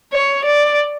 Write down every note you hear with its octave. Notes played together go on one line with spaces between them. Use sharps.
C#5
D5